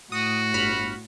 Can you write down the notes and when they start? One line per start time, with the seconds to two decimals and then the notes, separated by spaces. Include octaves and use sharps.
0.12 A2 F#4 D#6
0.54 G1 B5 F6